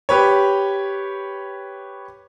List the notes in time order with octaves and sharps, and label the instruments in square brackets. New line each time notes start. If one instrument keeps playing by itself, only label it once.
[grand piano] G4 B4 C#5